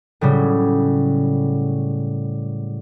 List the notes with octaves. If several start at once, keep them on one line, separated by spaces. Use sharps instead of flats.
A2 C#3 F#3 G3